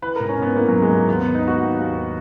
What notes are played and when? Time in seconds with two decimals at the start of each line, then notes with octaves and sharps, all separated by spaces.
0.02 E3 B4
0.16 A#4
0.20 G#2
0.29 C#4
0.38 G#2 B3
0.56 E3 A#3
0.68 F#3
0.72 G#2
0.82 G#3
0.91 G#2 A#3
1.08 D#2 B3
1.21 B3
1.26 D#2
1.35 D#4
1.43 D#3 F#4
1.61 D#2
1.79 D#2
1.96 D#3